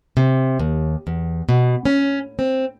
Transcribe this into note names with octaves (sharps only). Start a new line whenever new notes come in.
C3
D#2
E2
B2
C#4
C4